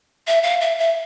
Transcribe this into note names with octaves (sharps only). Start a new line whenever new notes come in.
E5
F5
E5
E5